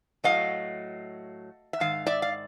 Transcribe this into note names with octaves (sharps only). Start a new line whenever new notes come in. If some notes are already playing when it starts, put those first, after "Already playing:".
A2 F#3 A3 D#5 F5
E5
G#2 D#3 F5
D5 E5
F5